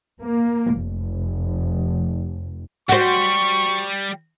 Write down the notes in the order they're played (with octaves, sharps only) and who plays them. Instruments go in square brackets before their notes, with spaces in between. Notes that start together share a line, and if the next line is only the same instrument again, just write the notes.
[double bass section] A#3
F1
[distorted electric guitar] G3 [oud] F#4 C5 [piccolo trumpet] C#6